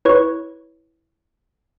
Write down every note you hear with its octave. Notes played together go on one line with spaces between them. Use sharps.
E4 B4 C#5 C#6